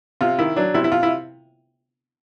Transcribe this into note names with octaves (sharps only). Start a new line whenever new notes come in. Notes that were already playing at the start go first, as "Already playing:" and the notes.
C3 F4
D#3 E4
F#3 D4
C3 E4
E4
C3 F4
E4